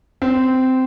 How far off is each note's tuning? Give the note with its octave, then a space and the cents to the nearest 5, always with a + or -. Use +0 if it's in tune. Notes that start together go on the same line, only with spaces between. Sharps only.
C4 -15